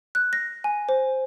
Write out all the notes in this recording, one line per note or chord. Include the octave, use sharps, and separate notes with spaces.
F#6
A#6
G#5
C5